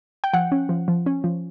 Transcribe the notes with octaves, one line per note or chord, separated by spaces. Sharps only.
G5
F3 F#5
C#4
F3
F3
C#4
F3